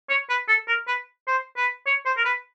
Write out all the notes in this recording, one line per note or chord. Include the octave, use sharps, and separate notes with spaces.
C#5
B4
A4
A#4
B4
C5
B4
C#5
C5
A#4
B4